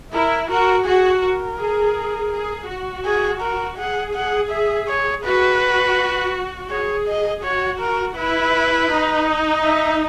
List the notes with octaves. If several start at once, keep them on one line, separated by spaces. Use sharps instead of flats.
E4 A#4
F#4 A#4
F#4 G#4
A#4
G#4
G#4
F#4
G#4
A#4
G#4 F#5
F#5
E5
C#5
F#4 B4
G#4 C#5
D#5
F#4 C#5
A#4
E4 B4
D#4
E5